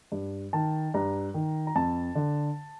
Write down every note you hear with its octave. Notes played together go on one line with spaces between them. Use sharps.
G2
D#3 A5
G2 A#5
D#3
A#5
F2 A5
D3